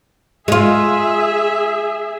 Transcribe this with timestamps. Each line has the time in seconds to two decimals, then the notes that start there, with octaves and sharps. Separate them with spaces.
0.48 G#3 F4 G#4 E5